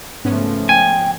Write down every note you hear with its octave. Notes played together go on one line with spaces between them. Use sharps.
G#2 C#3 F3 A3 B3 C#4
G5 G#5